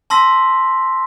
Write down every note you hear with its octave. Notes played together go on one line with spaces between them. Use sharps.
A5 C6 E6 A#6 B6